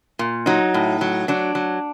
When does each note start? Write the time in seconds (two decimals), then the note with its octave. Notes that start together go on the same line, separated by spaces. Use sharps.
0.19 A#2
0.46 F#3 D#4
0.74 A2
1.01 F#3
1.28 F#3 D4
1.55 F#3